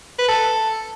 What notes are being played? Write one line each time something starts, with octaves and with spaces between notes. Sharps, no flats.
B4
A4